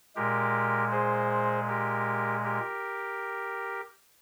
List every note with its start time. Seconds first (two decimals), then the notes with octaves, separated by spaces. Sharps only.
0.16 A#2 G#3 G4 A#4
0.91 G#4 C5
1.68 G4 A#4
2.44 G4 A#4